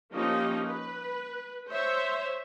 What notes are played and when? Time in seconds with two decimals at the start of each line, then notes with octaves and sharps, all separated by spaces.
0.12 F3 A#3 C#4 D#4 G4 D#5
0.65 B4
1.68 C5 C#5 E5